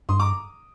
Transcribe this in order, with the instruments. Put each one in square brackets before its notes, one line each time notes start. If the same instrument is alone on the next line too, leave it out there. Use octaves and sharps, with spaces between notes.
[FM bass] G2 [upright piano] C6 D#6
[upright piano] A#5 D6